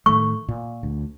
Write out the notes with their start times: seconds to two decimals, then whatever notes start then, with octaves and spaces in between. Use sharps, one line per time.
0.06 A2 D#3 A3 C#6
0.48 A#2
0.83 D2